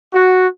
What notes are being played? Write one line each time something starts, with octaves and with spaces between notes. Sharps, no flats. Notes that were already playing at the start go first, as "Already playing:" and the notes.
F#4